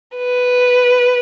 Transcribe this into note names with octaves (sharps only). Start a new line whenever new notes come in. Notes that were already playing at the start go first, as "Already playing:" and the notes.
B4